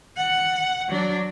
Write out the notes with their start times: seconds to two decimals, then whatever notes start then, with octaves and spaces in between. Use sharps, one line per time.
0.17 F#5
0.88 F#3 D4